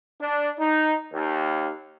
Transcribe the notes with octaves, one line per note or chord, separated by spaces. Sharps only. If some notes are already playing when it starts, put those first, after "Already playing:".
D4
D#4
D#2